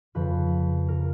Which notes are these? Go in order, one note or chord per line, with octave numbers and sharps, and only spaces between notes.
F2 C#3 F3 B4
A#4